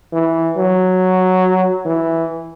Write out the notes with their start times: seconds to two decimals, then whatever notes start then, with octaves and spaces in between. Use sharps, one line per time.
0.13 E3
0.57 F#3
1.85 E3